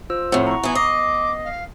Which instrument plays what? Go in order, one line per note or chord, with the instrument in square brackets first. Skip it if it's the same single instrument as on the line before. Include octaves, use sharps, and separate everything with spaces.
[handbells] F4 C5 E6
[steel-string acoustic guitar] F2 A2 [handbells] F#5
[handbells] A#5 C#6
[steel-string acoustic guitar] E3 B3 [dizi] G#5
[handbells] B3 A#6 C7 [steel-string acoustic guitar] D#5 [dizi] D6
[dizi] F5